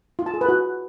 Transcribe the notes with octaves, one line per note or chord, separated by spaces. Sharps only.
F4
A5
G#4
B4
F#4